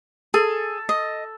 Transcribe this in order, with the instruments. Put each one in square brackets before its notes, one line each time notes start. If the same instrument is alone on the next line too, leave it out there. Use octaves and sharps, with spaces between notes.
[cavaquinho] G#4 [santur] A4
[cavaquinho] D#5